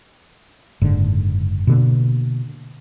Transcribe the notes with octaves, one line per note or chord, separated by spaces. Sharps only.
F#1 G#2 D3
B2 D3 A#3